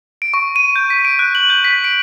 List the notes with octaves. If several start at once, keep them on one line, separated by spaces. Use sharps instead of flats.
D7
C#6
D#7
G6
B6
D7
F#6
F#7
G6
B6
D7